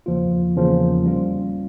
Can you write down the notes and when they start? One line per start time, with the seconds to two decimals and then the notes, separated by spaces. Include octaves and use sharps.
0.06 E2 C#3 F3 A#3 F4
0.55 E2 C#3 F3 A#3 F4
1.05 G3 C#4 F4